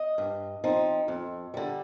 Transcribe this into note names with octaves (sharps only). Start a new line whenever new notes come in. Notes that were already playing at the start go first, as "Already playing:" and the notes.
Already playing: D#5
G2
F3 C4 D#4
F2
D3 G3